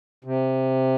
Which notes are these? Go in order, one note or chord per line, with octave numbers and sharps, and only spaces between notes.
C3